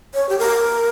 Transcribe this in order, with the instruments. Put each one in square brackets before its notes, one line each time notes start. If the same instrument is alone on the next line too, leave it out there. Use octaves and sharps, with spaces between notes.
[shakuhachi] C#5
G4
A#4